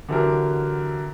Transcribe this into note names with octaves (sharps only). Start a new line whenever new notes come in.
D3 E3 F#3 G4 A#4